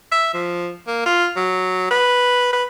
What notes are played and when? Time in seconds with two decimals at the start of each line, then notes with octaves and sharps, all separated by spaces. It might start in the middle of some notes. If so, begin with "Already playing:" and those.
0.12 E5
0.34 F3
0.87 A#3
1.06 F4
1.36 F#3
1.91 B4
2.53 B4